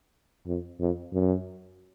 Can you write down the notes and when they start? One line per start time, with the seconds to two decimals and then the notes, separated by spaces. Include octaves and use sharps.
0.46 F2
0.80 F2
1.13 F#2